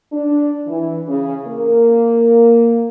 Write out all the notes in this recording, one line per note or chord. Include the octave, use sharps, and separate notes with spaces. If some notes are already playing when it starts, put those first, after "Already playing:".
D4
E3
C#3
A#3